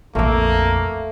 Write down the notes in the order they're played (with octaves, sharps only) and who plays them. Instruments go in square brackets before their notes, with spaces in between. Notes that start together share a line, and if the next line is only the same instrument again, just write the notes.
[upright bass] A#1 F2 [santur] A3 D6 E6 [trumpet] A#3